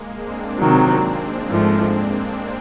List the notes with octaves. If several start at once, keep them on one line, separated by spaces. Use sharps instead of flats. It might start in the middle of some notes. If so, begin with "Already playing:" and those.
Already playing: G#3 A#3
C4 D4
C3 D#3 F#3
G#2 F3 A3